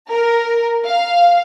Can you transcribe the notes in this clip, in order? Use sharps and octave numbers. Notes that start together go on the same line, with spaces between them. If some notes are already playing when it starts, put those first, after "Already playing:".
A#4
F5